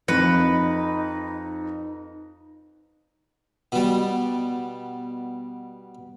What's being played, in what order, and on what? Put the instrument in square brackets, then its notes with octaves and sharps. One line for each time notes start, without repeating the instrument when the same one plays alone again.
[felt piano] F2 A#6 C#7 [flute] D#4 [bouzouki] B4
[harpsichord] B2 G3